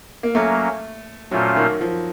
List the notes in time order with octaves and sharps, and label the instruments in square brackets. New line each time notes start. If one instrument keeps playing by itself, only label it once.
[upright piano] A#3
[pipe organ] F#3 A#3 C#4 [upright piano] A3
[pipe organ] A#2 A3 C#4 F4 C5 [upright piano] F#3
[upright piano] D#3
F3